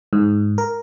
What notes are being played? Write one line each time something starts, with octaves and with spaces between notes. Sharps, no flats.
G#2
A#4